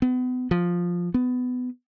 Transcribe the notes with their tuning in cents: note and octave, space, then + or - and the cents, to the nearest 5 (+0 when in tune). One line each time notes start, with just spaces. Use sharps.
B3 +35
F3 +5
B3 +20